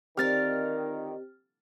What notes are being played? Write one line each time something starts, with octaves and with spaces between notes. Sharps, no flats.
D3 D#3 C4 F4 G4 A#4 F6 A6